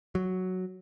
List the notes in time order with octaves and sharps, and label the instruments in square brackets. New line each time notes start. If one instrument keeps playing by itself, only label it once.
[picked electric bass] F#3